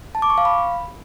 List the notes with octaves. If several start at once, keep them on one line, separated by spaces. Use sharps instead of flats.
A5
D6
C#6
F5
B5